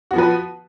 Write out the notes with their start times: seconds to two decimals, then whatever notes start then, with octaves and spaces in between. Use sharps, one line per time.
0.11 F#4
0.13 B3
0.16 F3
0.18 B4